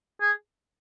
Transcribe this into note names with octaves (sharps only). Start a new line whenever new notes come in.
G#4